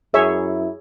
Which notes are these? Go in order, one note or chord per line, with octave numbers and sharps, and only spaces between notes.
F#2 E4 G#4 C#5 E5